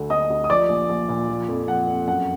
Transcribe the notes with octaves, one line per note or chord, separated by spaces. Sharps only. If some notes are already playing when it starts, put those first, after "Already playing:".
Already playing: D2 D3
D3 D#5 D#6
D2
D#6
F3 D5 D6
A#1
A#1
A#2
F3
F2
F3 F#5
F2
F#2 F#5